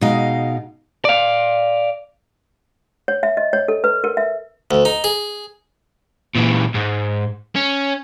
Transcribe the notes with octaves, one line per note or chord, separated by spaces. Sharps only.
B2 G#3 D#4 F5
D5 F5
C#5
E5
D#5
C#5
A4
B4
A#4
E5
D2
D#4
G#4
A#2 E3
G#2
C#4